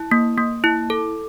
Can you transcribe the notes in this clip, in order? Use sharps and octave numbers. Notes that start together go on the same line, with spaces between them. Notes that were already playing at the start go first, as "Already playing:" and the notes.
Already playing: E4
A#3
A#3
E4
A4